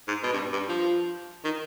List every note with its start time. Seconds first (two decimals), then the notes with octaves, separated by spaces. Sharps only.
0.08 G#2
0.23 B2
0.33 G2
0.53 G2
0.69 F3
1.44 D#3